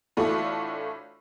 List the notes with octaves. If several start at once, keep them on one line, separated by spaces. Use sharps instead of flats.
A2 E3 A3 D4 F4 F#4